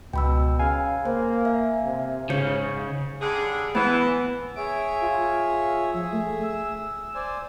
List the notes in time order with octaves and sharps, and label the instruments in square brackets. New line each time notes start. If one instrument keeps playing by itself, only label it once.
[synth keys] C#2 [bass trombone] B2 [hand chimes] G5 B5 E6
[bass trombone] C#3 [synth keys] F5 G#5
[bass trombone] A#3 [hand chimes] C5
[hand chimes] E5
[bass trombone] C3
[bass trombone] G#2 [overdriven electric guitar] C#3 [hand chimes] C#5 G6 C#7
[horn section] D3 G3 G#4
[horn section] E3 [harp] B3
[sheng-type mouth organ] G#4 C#5 E5 [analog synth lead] D7
[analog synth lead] F4
[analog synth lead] F3 [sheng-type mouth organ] G#4 E5
[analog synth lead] A3
E6
[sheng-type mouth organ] C5 D5 G#5